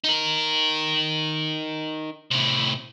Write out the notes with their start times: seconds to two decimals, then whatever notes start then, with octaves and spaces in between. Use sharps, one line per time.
0.04 D#4 A#4
2.31 A2 C3